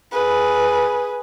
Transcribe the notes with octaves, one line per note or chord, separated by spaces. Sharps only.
G#4 B4